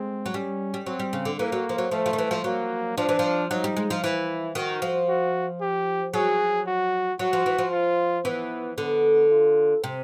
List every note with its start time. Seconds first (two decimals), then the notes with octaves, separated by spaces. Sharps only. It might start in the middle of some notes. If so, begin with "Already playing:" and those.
Already playing: G#3 C4
0.26 F#3
0.33 G3 C#4
0.74 G3
0.86 F#3 C4
0.99 G3
1.13 C#3
1.25 D3
1.39 E3 A#3
1.52 F#3
1.69 F3
1.78 F#3
1.91 F3 A3
2.06 F3
2.13 D#3
2.18 E3
2.31 F3
2.44 F#3 A#3
2.97 F3 D4
3.09 E3
3.19 F3
3.51 F#3 D#4
3.64 G3
3.77 G#3
3.90 F3
4.03 E3 E4
4.55 D#3 F#4
4.82 F3
5.09 F#4
5.61 G4
6.14 F#3 G#4
6.67 F#4
7.19 F#3 F#4
7.33 F3
7.46 E3
7.58 F3
7.72 F4
8.25 E3 B3
8.78 D3 B3
9.31 F4
9.84 C3